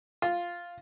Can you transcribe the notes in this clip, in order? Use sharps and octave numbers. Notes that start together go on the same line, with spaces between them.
F4